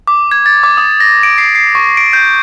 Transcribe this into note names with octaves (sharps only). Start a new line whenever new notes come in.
D6
G#6
A6
D6
D#6
A#6
D7
C7
C7
C#6
D7
G6